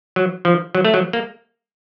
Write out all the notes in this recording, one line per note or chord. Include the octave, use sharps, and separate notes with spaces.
F#3
F3
F#3
A3
F#3
A#3